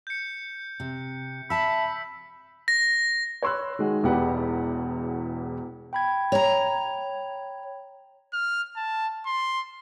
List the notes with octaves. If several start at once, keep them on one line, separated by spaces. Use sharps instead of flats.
G6 C#7
C3
E5 A5 B5 E6 B6
A#6
C#5 B5 C6 E6 F#6
D#3 G#3 F#4
E1 E2 B3 G4 F#5
G5 B5 G#6
C#5 A#5
F6
A5
C6